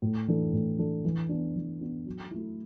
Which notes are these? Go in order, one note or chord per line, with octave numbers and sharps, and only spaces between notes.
A2
E3 D4 A4
A2
E3 D4 A4
E3
B3 D4
E3
B3 D4
F#3
A3 E4